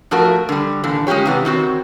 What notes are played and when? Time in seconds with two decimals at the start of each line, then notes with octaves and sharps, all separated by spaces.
0.11 A2 F3 A3 F#4 A#4
0.49 D3 G3
0.84 A#2 D3 E3
1.07 G#3 C#4 F4 G4 C#5
1.26 C3 E3 B3
1.45 D#3 C4 F#4 C#5